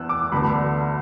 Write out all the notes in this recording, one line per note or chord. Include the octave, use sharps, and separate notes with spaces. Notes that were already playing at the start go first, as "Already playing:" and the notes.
Already playing: E2 E3 B3 E6 F#6
D6
D2 D3 B3 B5